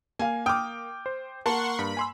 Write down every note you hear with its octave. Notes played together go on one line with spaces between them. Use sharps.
A#3 F5 G#5
G5 D6 D#6 F6
C5
A#3 F#5 A5 C6 C#6
G2 B5
G#5 C6 E6